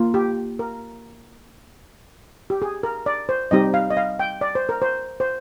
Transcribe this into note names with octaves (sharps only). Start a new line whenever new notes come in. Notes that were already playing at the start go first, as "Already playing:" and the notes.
Already playing: A#3 F4
G4
A#4
G4
G#4
A#4
D5
C5
G3 C4 D#4 G4 D#5
F5
D#5
F5
G5
D5
C5
A#4
C5
C5